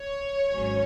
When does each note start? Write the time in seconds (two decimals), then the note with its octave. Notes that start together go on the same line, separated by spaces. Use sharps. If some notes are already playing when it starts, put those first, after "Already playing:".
Already playing: C#5
0.53 G#1 G#2 F#3 C#4